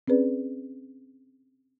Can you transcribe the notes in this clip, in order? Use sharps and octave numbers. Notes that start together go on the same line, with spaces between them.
C4 C#4 G#4 B4 D5